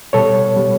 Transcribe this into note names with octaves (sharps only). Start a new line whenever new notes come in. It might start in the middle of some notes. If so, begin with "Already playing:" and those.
B2 G3 A4 C#5
B2 G3